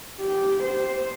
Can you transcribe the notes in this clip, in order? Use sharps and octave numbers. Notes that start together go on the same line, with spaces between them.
G4
C5